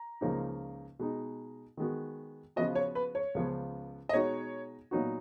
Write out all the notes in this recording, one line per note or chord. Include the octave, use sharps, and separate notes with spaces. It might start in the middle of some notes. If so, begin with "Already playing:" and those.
Already playing: A#5
C#2 C#3 F3 A#3 D#4
B2 G#3 D#4
D#3 G#3 B3 F#4
C#3 F3 B3 F#4 D#5
C#5
B4
C#5
C#2 C#3 F3 B3
D#5
B2 G#3 D#4 F#4 C#5
A#2 F#3 B3 D#4 F#4